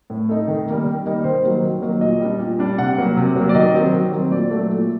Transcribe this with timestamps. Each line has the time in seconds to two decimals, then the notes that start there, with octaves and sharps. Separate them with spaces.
0.10 A2
0.29 A3 D#4
0.48 D#3
0.67 G3 A#3 D#4
0.86 D#3
1.06 G3 A#3 D#4
1.24 D#3 C5
1.44 F#3 A#3 D#4
1.63 D#3
1.82 F#3 A#3 D#4
2.01 A#2 D#5
2.20 G3 D4
2.39 A#2
2.59 G3 D4
2.78 C3 F#5
2.98 F#3 A#3
3.17 C3
3.35 F#3 A#3
3.49 D5
3.55 D#3 D#5
3.74 F#3 C4
3.93 D#3
4.12 F#3 C4
4.31 A#2 D5
4.51 F#3 A3
4.70 A#2